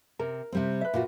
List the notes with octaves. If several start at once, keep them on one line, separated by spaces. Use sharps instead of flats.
C3 A#4
C3 G3 C4
B4 E5
A#2 F4 F#4